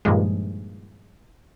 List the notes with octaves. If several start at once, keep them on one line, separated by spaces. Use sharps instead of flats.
G2 A#2 D#3 F3 G#3